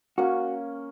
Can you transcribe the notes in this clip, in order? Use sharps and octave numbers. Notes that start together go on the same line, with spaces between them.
A#3 C#4 F#4